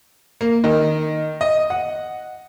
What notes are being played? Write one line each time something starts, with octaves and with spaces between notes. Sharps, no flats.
A#3
D#3
D#5
F#5